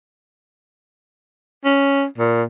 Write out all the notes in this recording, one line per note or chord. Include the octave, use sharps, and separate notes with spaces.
C#4
A#2